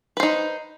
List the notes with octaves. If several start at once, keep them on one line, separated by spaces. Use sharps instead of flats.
D#4 B4 C5